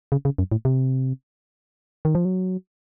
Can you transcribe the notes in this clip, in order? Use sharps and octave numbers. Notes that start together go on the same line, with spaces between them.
C#3
C#3
F#2
A2
C3
D#3
F3
F#3